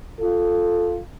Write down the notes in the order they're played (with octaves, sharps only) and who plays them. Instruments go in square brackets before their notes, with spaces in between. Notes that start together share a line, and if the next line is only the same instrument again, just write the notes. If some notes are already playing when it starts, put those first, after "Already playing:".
[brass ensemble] F4 A4